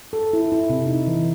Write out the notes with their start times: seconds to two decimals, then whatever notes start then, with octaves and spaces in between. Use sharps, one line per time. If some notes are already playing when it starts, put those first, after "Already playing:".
0.13 A4
0.33 E4
0.52 E4
0.70 C3
0.86 D#4
1.07 E3